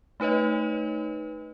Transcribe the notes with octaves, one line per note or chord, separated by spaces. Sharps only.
A3 D#4 B4 C#5 D#5